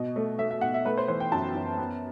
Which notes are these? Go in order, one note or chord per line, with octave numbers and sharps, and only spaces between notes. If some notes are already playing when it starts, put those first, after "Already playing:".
Already playing: B2 D#5
A3
A3 E5
E5
B2 F#5
E5
A3 B4
C5
E3 C5
G5
F#2 A5
F#2
B3